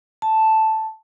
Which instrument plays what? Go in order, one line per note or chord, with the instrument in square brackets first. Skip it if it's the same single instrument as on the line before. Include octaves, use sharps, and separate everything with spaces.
[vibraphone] A5